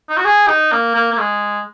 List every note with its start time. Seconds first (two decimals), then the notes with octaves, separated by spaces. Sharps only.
0.09 D#4
0.17 F#4
0.25 G#4
0.48 D#4
0.72 A#3
0.94 A#3
1.12 A#3
1.18 G#3